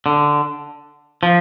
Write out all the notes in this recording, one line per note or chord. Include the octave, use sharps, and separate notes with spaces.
D3
F3